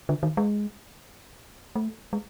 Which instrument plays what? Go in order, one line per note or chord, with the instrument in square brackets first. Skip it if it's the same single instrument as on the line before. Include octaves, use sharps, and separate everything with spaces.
[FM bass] D3
D#3
G#3
A3
G#3